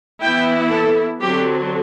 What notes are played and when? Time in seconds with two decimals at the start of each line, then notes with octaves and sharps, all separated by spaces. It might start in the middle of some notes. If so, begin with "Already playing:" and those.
0.21 E3 B3 E4 G5
0.71 A4
1.21 D3 F#3 C4 G4